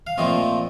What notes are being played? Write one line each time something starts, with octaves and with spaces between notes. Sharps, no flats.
F5
A#2 F3 A3 C4 D#5